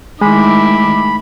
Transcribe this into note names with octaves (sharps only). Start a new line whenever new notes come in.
D#3 G#3 A3 E4 B5 D6